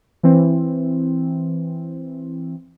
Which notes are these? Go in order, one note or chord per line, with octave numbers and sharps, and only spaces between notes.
E3 C4